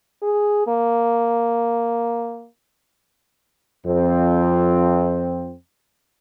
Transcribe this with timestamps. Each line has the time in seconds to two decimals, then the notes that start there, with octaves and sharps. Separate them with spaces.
0.22 G#4
0.67 A#3
3.86 F2 C4